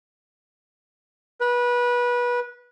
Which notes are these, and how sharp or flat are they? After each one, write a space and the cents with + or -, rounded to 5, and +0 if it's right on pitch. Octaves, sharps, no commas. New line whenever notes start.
B4 -25